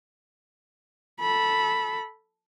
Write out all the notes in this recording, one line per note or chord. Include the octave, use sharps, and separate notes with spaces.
A4 B5